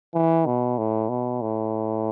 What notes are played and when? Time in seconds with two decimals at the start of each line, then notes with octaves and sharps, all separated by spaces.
0.14 E3
0.46 B2
0.78 A2
1.09 B2
1.41 A2